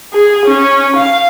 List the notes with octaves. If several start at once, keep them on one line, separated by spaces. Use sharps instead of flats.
G#4
C#4
F5